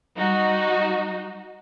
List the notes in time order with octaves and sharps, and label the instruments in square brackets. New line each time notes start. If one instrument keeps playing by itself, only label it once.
[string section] G3 D#4 F#4